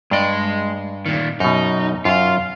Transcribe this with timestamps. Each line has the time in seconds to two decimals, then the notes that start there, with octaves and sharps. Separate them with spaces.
0.11 G2 G#3 D5 D#5
1.06 A#2 D#3
1.40 F#2 B2 D#4
2.05 F#2 F4 F5